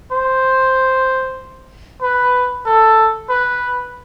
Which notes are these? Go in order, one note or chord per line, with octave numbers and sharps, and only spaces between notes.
C5
B4
A4
B4